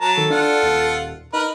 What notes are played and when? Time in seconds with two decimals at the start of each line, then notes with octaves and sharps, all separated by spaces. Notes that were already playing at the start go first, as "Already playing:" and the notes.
0.01 F#3 A5 A#5
0.17 D#3 A4
0.30 D4 F4 F#5
0.62 D#1
1.33 D#4 A#4 B4